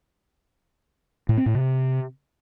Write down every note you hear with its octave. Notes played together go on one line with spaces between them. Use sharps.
A2
C4
A2
C3